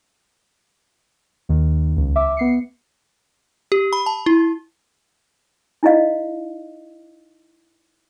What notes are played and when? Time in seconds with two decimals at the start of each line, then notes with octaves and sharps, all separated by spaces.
1.49 D#2 D#3
1.97 C#2
2.16 E5 D6
2.37 B3 C7 C#7
3.72 G4
3.93 B5
4.06 A5
4.26 E4
5.83 D#4 E4 D5 D#5 F5